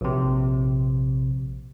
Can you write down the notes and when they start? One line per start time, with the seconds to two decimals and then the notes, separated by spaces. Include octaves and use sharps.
0.01 A#1 C3